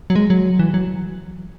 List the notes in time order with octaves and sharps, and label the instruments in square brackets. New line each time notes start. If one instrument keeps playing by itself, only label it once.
[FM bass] F#3
G#3
F#3
E3
F#3